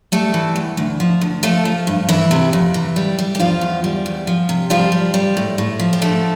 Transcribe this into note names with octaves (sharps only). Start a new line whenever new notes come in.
G3 A3 A4
E3
E2
D2
F3
D2
F3 A3 A4
F3
G2
F2 E3 E4
C3
F2
E3
G3
G3
G4
E2 F3 F4
E2
G3
E2
F3
C3
F3 G3 F4
G3
G3
A2
A2
F3
G4
D2 A3 A4